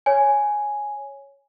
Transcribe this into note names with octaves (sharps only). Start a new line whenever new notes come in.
C#5 G#5